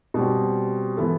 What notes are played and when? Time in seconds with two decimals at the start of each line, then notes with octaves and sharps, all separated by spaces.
0.14 B2 G3 C4
0.97 E3 B3 E4 A4